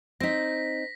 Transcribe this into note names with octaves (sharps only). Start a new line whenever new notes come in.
C4 D#4 A#6 B6